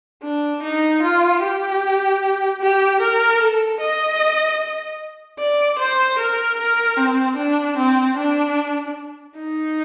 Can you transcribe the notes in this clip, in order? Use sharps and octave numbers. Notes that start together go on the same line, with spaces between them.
D4
D#4
F4
G4
G4
A#4
A4
D#5
D5
C5
A#4
A#4
C4
D4
C4
D4
D#4